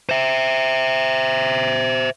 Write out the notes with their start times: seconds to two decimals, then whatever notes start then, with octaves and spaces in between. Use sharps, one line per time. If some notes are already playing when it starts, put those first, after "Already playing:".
0.09 C5 E5